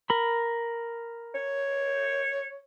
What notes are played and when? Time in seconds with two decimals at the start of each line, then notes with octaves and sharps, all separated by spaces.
0.10 A#4 B5
1.35 C#5